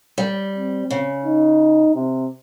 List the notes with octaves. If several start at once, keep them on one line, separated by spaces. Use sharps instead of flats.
G3
C4
C#3
D#4
C3